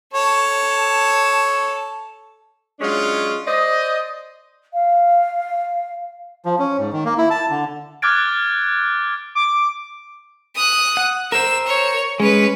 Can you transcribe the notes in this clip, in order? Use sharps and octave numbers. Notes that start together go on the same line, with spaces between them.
A4 C#5 A5
F#3 G#3 C#4 D4 F4
C5 D5 D#5
F5
F3
C#4
G#2
D#3
A#3
E4
A5
D3
D6 F6 F#6 G#6 A6 D7
D6
D#6 F#6
F#5
A#4 C5 E6
C#5
G#3 C#4 B4